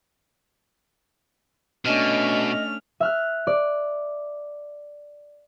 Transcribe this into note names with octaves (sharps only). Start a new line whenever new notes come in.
B2 A3 C#4 D4 D#5 F6
E5 F6 F#6
D5